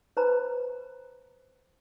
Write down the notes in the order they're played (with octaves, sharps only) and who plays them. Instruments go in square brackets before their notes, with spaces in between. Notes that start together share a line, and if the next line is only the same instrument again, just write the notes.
[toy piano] B4 C5 A#5 B5